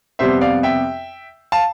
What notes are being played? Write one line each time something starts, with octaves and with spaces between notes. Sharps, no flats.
F2 C3 G3 B3 C5 E5
D5 F5
E5 G5
F5 A5